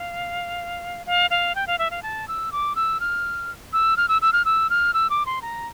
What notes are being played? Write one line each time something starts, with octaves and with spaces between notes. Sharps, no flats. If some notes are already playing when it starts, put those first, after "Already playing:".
Already playing: F5
F5
F5
G5
F5
E5
F5
A5
E6
D6
E6
F6
E6
F6
E6
E6
F6
E6
F6
E6
D6
C6
A#5